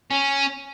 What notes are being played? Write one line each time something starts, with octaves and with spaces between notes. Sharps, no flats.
C#4